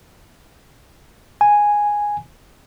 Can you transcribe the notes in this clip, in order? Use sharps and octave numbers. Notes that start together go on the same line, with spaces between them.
G#5